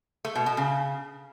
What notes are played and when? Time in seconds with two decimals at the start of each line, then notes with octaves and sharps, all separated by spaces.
0.25 A3
0.35 B2
0.46 B2
0.57 C#3